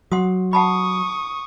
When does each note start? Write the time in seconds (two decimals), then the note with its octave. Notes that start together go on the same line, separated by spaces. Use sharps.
0.12 F#3 F#5 C6 D#6
0.53 F#5 A5 B5 C#6 D#6